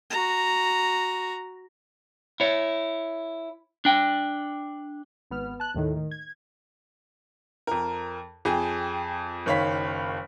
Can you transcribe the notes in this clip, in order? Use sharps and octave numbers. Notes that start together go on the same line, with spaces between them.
F#4 A#5
E4 C#5
D4 G5
G#1 B3 F6
A5 F#6
D#2 A2 D#3
D#3
G#6
F2 A#4
F2 G#4 G5
F#1 D#3 C#5 F5 B5 B6